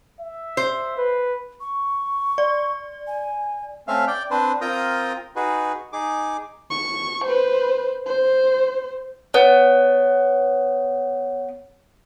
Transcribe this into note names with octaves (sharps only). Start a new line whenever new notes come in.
E5
C5
B4
C#6
D5
G#5
A3 C4 C#4 E5 F5
D5 G5
C4 D4 B4 C5
C4 F4 A#4 G5 A#5 D#6
D#4 F#4 G#4 B4
D#4 G#4 D6
C#6
B4 C5
C5
B3 C#5